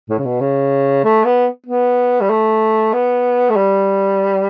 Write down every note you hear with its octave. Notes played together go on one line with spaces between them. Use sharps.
A2
C#3
B2
C#3
A3
B3
B3
G3
A3
B3
A3
G3